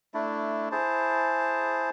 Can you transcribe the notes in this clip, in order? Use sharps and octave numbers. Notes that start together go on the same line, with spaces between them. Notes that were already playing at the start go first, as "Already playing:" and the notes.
A3 D4 E4
E4 G#4 C5 A5